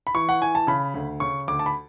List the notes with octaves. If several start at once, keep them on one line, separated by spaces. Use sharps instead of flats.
B5
E3 C#6
F#5
E3 G#5
A5
C#3 B5
D2
C#3 C#6
D2 D6
A5
B5